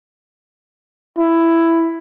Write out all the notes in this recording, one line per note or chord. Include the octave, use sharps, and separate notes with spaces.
E4